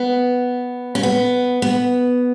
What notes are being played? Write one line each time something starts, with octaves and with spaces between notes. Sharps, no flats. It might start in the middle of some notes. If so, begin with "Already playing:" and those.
Already playing: B3
C#4
B3
B3